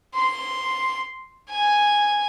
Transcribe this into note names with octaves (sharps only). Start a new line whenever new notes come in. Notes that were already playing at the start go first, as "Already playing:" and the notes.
C6
G#5